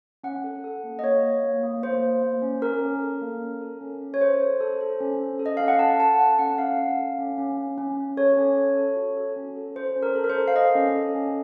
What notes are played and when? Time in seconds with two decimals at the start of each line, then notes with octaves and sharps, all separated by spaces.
0.24 C#4 F#5
0.44 A4
0.64 A4
0.84 A#3
0.99 D#5
1.03 A#3 C#5
1.23 A#3
1.43 A#3
1.63 A#3
1.83 A#3 C5
2.02 A#3
2.22 A#3
2.42 C#4
2.62 C#4 A#4
2.82 C#4
3.02 A4
3.22 A#3
3.42 C#4
3.61 A4
3.81 C#4
4.01 C#4
4.14 C#5
4.21 A4 C5
4.41 A4
4.61 A4
4.81 A4
5.00 C#4
5.20 C#4
5.39 A4
5.46 D#5
5.57 C#4 F5
5.68 F#5
5.79 A4 A5
5.99 A4 A5
6.19 A4 F#5
6.39 C#4 F#5
6.58 C#4 F5
6.78 C#4
6.99 A4
7.19 C#4
7.38 C#4
7.58 C#4
7.78 C#4
7.98 C#4
8.17 A4 C#5
8.37 C#4
8.57 A4
8.77 A4
8.96 F#4
9.17 A4
9.36 C#4
9.57 A4
9.76 A4 C5
9.96 C#4
10.03 A#4
10.15 A4
10.24 A#4
10.30 C5
10.35 A4
10.48 F5
10.55 A4 D#5
10.75 C#4
10.95 A4
11.15 C#4